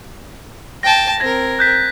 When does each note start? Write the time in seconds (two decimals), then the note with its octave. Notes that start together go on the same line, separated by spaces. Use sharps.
0.83 G5 A5 A#6
1.20 C4 A#4 G#6 A#6
1.59 F#6 G6 B6